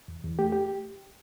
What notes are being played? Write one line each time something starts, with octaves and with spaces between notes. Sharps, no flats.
E2
E2
A3 G4
G4